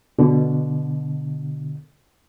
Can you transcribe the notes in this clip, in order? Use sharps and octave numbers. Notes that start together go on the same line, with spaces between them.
B2 D3